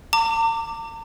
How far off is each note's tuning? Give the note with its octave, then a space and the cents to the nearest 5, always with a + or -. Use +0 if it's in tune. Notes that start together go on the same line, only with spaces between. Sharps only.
A#5 -45 D6 +0